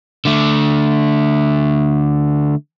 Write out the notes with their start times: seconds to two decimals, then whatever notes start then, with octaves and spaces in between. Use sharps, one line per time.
0.25 D3 A3